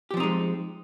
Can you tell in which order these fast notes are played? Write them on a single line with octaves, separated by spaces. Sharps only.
G4 F3 C4 D#4 G#3